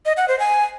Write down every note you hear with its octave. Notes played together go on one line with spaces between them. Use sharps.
D#5
F#5
C5
G#5